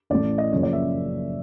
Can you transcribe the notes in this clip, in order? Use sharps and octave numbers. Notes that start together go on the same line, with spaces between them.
A1 A2 E3 A3 D5
D#5
F#1 F#2 C#3 F3 A#3 C#5
D5
E5